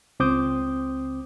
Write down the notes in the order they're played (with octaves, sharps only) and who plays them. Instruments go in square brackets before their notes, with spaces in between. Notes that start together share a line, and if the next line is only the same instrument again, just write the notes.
[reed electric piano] C#2 C4 C5 D6 D#6 G6